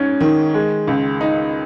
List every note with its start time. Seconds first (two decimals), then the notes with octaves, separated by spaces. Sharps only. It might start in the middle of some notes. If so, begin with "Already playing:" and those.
Already playing: G#2 C#4
0.21 D#3
0.54 G#3
0.87 C#2
1.21 D#4